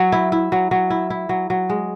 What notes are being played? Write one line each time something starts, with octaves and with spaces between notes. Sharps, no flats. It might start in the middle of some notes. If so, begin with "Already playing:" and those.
Already playing: F#3
E4
E4
F#3
F#3
E4
E4
F#3
F#3
G#3